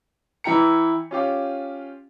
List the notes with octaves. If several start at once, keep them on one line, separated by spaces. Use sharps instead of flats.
E3 E4 G5 A#5 C#7
C#4 F4 G4